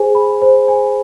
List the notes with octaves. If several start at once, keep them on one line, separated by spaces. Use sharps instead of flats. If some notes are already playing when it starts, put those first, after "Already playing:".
Already playing: G#4 C5 G#5
B5
C5
G#5